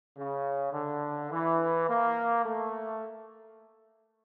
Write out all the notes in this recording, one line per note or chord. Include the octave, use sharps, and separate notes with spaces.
C#3
D3
E3
A#3
A3